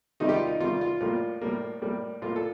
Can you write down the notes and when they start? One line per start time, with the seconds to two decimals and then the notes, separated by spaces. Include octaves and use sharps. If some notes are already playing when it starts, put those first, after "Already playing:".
0.20 C3 D#3 G3 D#4
0.29 G4
0.34 F4
0.47 D#4
0.60 C3 D#3 G3 F4
0.81 F4
1.01 A2 G3 A#3 F4
1.41 A2 G3 A#3
1.82 A2 G3 A#3
2.22 A2 G3 A#3 F4
2.36 A4